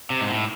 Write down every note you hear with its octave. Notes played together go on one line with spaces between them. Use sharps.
C3
G#2
A2